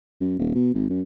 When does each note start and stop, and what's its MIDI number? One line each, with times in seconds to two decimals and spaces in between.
0.20 0.34 42
0.38 0.52 27
0.55 0.73 47
0.74 0.85 32
0.89 1.01 42